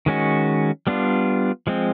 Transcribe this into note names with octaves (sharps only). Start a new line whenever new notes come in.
D#3 G#3 C#4 F#4
G3 B3 D4 F4
F3 G#3 C4